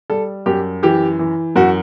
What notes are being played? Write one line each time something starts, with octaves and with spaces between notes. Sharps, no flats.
G3 A4
F#2 G4
E3 G4
E3
F#2 F#4